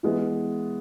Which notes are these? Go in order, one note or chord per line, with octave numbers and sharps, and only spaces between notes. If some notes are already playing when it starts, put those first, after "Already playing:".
E3 G#3 B3